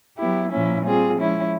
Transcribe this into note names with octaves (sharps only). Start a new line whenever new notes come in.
F#3 B3 E4 G4
A#2 F3 A#3 C#4 E4
G3 C4 F4 G#4
F3 G#3 C#4 E4